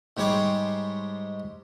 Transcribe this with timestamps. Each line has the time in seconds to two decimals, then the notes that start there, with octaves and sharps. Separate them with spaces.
0.17 G#2 G3 G#3 C#5 C6 D6